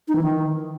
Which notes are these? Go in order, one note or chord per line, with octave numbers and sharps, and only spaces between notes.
D#4
E3
D#3